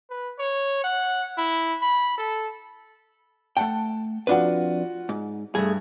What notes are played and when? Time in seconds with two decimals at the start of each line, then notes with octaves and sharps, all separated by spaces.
0.10 B4
0.39 C#5
0.84 F#5
1.38 E4
1.81 B5
2.18 A4
3.57 A3 F#5 G5 A5
4.27 F2 D4 F4 F#4 B4 F#5
5.09 G#2
5.55 G2 A3 G#4